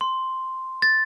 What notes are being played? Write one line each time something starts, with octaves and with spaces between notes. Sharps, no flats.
C6
A6